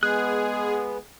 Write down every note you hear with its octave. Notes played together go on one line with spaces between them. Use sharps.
G#3 B3 G#4 F#6